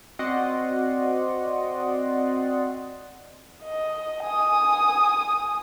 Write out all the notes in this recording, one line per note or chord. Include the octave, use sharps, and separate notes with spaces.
C4 F#4 D5 D#5 F#5 C6
D#5
G#5 D#6